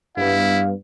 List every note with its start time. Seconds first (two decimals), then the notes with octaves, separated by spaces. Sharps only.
0.17 G2 G3 B3 E4 F5